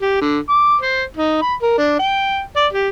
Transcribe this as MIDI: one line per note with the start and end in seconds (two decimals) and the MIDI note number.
0.02 0.16 67
0.22 0.39 50
0.49 0.75 86
0.81 1.03 72
1.17 1.41 63
1.42 1.54 83
1.62 1.75 70
1.78 1.98 62
1.99 2.40 79
2.56 2.67 74
2.73 2.89 67